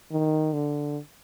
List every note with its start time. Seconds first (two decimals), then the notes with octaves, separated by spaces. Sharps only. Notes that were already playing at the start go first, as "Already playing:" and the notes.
0.11 D#3
0.53 D3